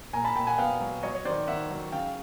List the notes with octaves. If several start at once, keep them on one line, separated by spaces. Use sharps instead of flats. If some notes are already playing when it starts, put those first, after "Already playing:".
A#2 G#5 A#5
A5 B5
A#2 G5 A5
F#5 G#5
B3 F5 G5
F#3
F#3 C#5 D#5
C#5
D#3 C5 D5
D#3 E5 F#5
F#3
C#3 F5 G5